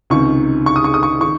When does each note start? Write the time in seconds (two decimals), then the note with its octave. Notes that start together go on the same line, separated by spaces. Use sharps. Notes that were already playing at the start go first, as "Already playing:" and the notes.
0.10 C#2 C3 D#3 C#6
0.66 C#6
0.76 D#6
0.84 C#6
0.94 D#6
1.03 C#6
1.21 D#3 C#6